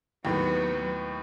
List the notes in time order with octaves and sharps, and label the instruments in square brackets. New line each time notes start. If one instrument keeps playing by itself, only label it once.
[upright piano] D#2 A2 [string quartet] F#3 B3